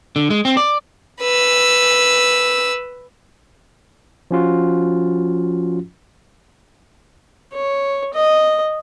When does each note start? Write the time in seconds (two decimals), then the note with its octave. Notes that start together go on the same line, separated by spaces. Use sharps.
0.16 D3
0.30 G#3
0.45 C4
0.57 D5
1.21 B4 E6
4.31 F3 C#4 F4 F#4
7.53 C#5
8.13 D#5